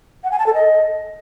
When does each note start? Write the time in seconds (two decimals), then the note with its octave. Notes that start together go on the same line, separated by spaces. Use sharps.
0.24 F#5
0.31 G#5
0.39 A5
0.46 A4
0.54 D#5